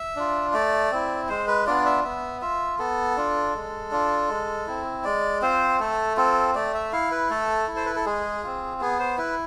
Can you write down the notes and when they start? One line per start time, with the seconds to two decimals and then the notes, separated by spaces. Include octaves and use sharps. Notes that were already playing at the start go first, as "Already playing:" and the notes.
Already playing: E5
0.16 D4 F4
0.53 A3 D5
0.91 C4 E4
1.29 G#3 C5
1.48 B4
1.66 B3 D4 F4 D5
1.85 E5
2.04 B3 E5
2.42 F4 E5
2.79 B3 A4
3.17 D4 F4
3.55 G#3
3.91 D4 F4
4.29 G#3
4.67 C4 E4
5.05 G#3 D5
5.42 C4 F4 C5
5.80 A3 A4
6.17 C4 F4 A4
6.55 A3 D5
6.74 E5
6.93 E4 F5
7.11 B4
7.30 A3 A4
7.68 E4
7.76 C5
7.86 B4
7.96 A4
8.06 G#3 G#4
8.44 C4 F4
8.81 B3 G#4
8.99 C5
9.18 E4 B4